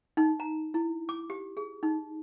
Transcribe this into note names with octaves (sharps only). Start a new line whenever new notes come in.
D#4
A#5
E4
D6
G4
G#4
D#4